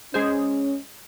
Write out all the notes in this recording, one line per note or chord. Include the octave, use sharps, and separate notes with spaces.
G#3 C#4 G#4 C5